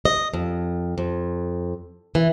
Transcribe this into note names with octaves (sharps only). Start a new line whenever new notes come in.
D#5
F2
F2
E3